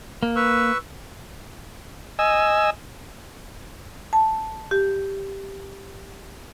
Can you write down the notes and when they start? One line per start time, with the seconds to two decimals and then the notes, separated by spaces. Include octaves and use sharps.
0.23 A#3
0.36 B4 C#6 E6
2.19 D#5 G#5 E6
4.13 A5
4.71 G4